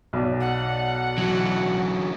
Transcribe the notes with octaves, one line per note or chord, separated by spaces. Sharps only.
B1 D5
F#5
D3 E3 F#3